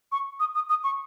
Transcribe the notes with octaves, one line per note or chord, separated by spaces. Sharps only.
C#6
D#6
D#6
D#6
C#6